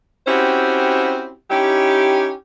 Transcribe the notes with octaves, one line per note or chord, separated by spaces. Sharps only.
C4 C#4 E4 F#4 G4 C5
C#4 D#4 E4 G4